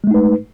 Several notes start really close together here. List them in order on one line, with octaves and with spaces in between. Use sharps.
G#3 A3 D#4 B4